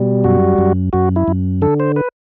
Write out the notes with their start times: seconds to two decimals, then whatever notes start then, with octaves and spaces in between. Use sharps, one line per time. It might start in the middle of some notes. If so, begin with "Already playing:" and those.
Already playing: B2 G3
0.24 F#2 F#4
0.58 F#2
0.93 F#2 F#4
1.16 E4
1.28 F#2
1.62 D3 A4
1.80 C5
1.96 B4